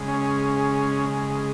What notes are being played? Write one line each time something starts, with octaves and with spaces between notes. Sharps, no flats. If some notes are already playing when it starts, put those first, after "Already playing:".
Already playing: C#3 G#3
C#4